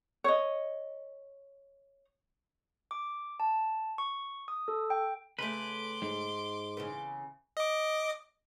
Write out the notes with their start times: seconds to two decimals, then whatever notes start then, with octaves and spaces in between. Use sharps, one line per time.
0.24 C#5 D#5
2.91 D6
3.40 A5
3.98 C#6
4.48 D#6
4.68 A4
4.90 G5
5.39 C#3 A3 B4 C6 D6
6.02 G#2
6.77 C#3 E3 B3
7.57 D#5 D6